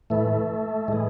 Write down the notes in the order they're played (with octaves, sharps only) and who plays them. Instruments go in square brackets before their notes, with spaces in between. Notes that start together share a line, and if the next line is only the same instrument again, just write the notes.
[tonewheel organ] A2 E3 A3
A2 E3 G#3